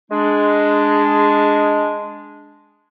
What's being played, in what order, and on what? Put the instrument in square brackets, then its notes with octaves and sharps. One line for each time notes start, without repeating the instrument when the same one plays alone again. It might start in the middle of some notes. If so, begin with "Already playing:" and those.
[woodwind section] G#3 D4